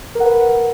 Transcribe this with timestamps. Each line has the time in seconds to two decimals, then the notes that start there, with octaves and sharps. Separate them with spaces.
0.15 A#4
0.20 F#5
0.25 B4